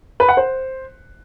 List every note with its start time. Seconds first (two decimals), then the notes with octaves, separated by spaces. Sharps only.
0.20 B4
0.29 F#5
0.37 C5